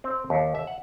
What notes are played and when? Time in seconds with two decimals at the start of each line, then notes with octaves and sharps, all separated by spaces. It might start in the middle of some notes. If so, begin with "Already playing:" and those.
0.04 C4
0.30 D#2
0.55 E5
0.67 F#5